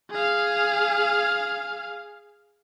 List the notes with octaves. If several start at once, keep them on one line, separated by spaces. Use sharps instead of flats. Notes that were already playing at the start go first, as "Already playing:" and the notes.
G#4 F5